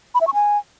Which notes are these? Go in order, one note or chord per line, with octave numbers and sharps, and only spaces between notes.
B5
E5
C#6
G#5